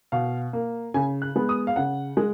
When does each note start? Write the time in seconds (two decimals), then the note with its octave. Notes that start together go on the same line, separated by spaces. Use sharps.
0.12 B2 F5
0.53 A#3
0.94 C#3 G#5
1.22 F#6
1.36 G#3 B3
1.49 D#6
1.67 F5
1.76 C#3 F#5
2.17 G#3